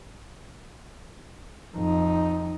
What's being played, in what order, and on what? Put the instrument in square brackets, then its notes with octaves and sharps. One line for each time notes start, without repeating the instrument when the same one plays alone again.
[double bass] F2 D#4